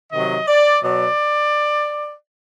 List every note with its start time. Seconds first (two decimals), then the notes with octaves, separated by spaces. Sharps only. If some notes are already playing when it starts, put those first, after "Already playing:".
0.12 C3 D#3 F#3 D#5
0.48 D5
0.83 B2 F#3 D5